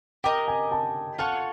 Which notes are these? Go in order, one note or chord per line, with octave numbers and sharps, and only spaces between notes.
G4 A#4 D#5 G5
G#5
A5
F4 A4 C#5 F#5 A5